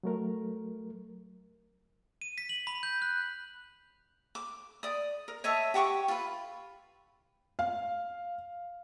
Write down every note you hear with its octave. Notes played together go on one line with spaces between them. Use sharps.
F#3 A3 A#4
D#7
B6
F#7
B5
G6
F#6
D6
D5 D#6
A#4
C#5 D#5 E5 A5
G4 F#5 C#6 D6
F4 B4
F5